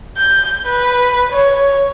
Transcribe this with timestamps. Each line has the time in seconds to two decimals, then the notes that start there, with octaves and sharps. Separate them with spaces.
0.17 G6
0.66 B4
1.32 C#5